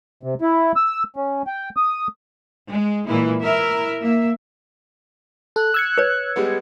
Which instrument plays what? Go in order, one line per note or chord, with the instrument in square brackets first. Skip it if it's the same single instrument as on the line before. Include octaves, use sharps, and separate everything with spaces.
[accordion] C3
E4
E6
C#4
G5
D#6
[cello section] G#3
A#2 E3 G#3 A#3 E4
E4 A#4 E5
A#3 E5
[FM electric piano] A4 [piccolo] F#6
[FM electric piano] E6 G#6 C#7
[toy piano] B4 C#5
[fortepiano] G3 G#3 B3